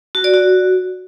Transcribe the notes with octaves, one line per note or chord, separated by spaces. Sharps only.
F#4
D5
F#4